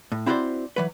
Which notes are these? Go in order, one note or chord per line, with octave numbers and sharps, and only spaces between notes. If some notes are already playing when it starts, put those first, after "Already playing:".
A2
C4 E4 F#4 A#4 C5 D5
E3 F#3 B4